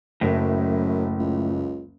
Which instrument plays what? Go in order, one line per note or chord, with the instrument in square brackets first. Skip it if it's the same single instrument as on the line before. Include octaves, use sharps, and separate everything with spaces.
[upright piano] F#1 [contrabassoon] F#2 [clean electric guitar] A2
[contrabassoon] C#2